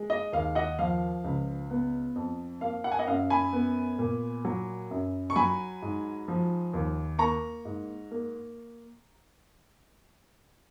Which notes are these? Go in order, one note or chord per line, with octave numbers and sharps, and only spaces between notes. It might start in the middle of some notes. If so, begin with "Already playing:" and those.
Already playing: G#3
D#5
D#2 F5
D#5 F#5
F3 F5
C#2
B3
F2
A#3 F5
F#5
G#5
D#5 F#5
F#2 F5
G#5 B5
B3
A#2
F#3
F#2
C#6
F#3 G#5 B5
G#2
F3
D#2
A#3 A#5 C#6
G#2
A#3